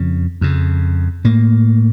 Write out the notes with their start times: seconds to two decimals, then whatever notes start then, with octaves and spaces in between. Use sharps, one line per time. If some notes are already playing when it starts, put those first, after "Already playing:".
Already playing: F2 C#3
0.41 F2 C#3
1.24 A2 A#3